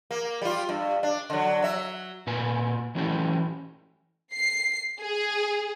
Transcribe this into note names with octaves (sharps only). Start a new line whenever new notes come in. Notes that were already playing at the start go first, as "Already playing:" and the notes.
A#3
G3 F4
G2
D4
D3 F#3
F#3 E5
A#2 B4 G#5
E3 F#3 C#4 E4 G4
C7
G#4